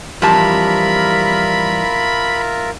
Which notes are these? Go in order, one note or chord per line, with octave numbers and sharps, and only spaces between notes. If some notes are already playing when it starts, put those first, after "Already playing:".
F2 E3 G3 F4 A#4 E5 A5 B5